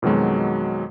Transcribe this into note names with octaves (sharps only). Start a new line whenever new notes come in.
F2 B2 D#3 F#3 G#3